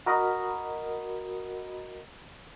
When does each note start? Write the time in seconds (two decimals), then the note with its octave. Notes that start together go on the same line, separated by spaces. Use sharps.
0.06 F#4 A#4 D#5 B5